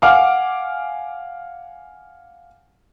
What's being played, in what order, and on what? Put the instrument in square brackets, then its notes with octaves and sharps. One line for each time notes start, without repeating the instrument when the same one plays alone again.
[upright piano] F5 F#5 G#5 D6 F6